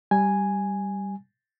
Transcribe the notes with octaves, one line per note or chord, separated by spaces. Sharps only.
G3 G#5